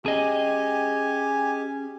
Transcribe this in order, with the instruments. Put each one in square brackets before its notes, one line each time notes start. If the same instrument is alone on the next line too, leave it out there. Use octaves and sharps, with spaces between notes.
[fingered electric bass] C#4 [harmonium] G4 [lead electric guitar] G#4 D#5 [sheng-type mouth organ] G#5